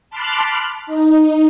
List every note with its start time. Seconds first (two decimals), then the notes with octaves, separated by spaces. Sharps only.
0.10 A5 B5 C6 D6 F6 F#6
0.87 D#4